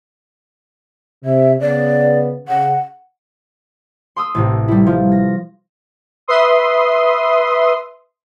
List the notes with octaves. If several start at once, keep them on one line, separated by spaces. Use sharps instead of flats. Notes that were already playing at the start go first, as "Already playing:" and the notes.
C3 E5
C#3 B3 D5
C#3 F#5
C6 D#6 E6
A1 A2 C3
G3 E4
F3
A#6
B4 E5 C6 D#6